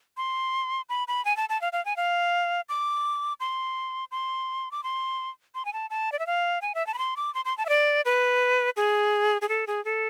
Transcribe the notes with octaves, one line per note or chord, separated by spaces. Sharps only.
C6
B5
B5
G#5
A5
A5
F5
F5
G#5
F5
D6
C6
C6
D6
C6
C6
G#5
A5
A5
D5
E5
F5
G#5
E5
A5
B5
C6
D6
C6
C6
A5
E5
D5
B4
G#4
G#4
A4
G#4
A4